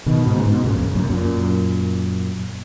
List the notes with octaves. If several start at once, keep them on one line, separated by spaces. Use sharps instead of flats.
B2 D#3
G#2 B2
C#3
G#2 B2
A#2 C#3
E2
F#2
F#2 A#2
B2
F#2 A#2